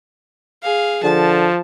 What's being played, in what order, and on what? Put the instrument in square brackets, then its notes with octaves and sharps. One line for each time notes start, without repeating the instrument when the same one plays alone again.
[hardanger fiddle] G#4 F5
[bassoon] D3 [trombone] F3 [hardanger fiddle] A5